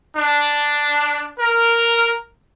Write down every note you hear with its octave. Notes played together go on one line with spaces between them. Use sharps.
D4
A#4